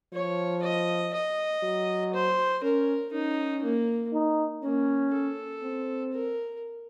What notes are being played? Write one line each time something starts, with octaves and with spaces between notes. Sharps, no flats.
F3 C#5
D#5
D#5
F#3
C5
C#4 A#4
C#4 D#4
A#3
D#4
A#3 C#4
A4
C4
A#4